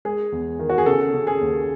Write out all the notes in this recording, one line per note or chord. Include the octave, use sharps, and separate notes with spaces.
G#3 G#4
E2
D#3
F#4
G#4
C#3 A4
C#3
G#4
D#2